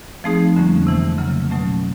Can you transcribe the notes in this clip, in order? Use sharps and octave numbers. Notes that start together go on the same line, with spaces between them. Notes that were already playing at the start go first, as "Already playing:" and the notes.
F3 A3 C4 D#4 G#4
F2 D3 G3 A#3 C#4
C3 E3 A3
C#3 F#3 A#3
B2 F#3 A3 C#4